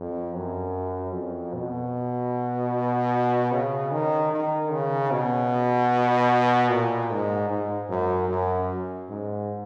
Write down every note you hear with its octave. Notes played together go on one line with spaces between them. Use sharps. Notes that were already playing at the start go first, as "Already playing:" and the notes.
Already playing: F2
F#2
F2
B2
C#3
D#3
D#3
C#3
B2
A#2
G#2
G#2
F#2
F#2
G#2